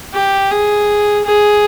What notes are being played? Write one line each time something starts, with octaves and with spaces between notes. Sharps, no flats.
G4
G#4
G#4